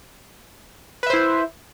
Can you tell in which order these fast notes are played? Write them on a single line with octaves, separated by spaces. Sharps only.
B4 E5 C5 E4